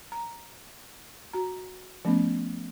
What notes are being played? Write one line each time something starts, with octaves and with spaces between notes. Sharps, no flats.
A#5
F#4 A#5
F3 A3 B3 C#4